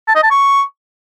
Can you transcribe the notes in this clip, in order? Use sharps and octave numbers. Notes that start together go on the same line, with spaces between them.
A5
D#5
A5
C#6